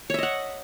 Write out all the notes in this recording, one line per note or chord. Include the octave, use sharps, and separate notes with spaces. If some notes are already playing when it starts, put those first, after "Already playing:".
C#5 D#5 E5 F#5